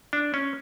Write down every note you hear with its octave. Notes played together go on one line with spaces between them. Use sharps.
D4
C#4